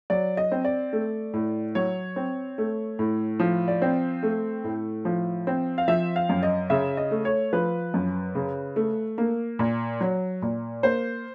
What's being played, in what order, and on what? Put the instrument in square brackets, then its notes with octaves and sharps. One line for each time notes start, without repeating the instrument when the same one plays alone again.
[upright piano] F#3 D5
D#5
C4
D5
A3
A2
F#3 C#5
C4
A3
A2
F3
D5
C4
A3
A2
F3
C4
F5
F3 E5
F5
F#2
D#5
C#3 E5
D#5
A3
C#5
F3 B4
F#2
C#3
A3
A#3
A#2
F#3
A#2
A#3 C5